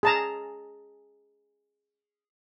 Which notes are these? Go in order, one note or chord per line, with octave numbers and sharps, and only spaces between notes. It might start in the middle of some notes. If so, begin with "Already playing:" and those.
G#4 A5 A#5